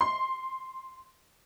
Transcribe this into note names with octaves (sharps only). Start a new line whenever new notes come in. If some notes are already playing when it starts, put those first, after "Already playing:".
C6